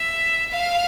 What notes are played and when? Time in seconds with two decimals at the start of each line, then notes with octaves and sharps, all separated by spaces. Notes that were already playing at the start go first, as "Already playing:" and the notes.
Already playing: E5
0.52 F5